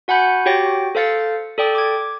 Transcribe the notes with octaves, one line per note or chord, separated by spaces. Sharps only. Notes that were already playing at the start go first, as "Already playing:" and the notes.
F#4 F#5 G#5 B5 G6 C#7
F#4 G4 C#5 G5 A6 A#6
A4 C5 F5 A6 C#7
A4 D5 G5 D#6
D6 G#6